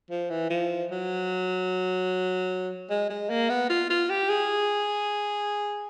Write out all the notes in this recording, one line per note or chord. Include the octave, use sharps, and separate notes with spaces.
F3
E3
F3
F#3
G#3
G#3
A#3
B3
F4
F4
G4
G#4